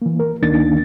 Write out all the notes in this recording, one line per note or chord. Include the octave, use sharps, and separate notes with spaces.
E3 A#3
A#4
D2 D#3 A#3 D4 D#4 A6